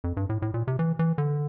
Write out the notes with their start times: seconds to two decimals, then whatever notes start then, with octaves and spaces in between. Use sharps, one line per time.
0.04 F2
0.17 G2
0.29 A2
0.42 A2
0.54 A#2
0.68 C3
0.79 E3
0.99 E3
1.18 D3